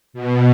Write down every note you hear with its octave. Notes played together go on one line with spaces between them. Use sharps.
B2